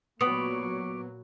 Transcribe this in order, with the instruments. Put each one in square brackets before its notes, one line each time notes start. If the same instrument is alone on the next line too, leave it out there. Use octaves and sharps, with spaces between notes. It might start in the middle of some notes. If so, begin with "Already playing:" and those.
[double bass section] A#2 F#3 [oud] B3 [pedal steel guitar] C#5 D5 B5 [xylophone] D#6